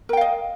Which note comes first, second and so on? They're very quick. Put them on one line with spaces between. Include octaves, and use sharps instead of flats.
A#4 G5 F5 D#5